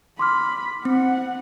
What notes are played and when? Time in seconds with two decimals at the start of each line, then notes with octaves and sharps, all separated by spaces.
0.19 B5 C6 D6 F6
0.85 C4 F#5